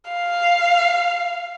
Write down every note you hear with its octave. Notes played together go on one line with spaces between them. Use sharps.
F5